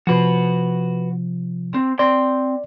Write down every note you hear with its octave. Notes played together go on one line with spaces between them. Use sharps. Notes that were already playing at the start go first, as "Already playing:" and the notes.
C3 F3 F#4 B4
C4
C4 D5 C6